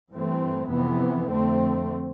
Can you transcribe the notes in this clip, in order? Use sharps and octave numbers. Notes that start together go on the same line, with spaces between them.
G2 E3 A3 C4
F2 C3 E3 B3
F2 D3 A3 C4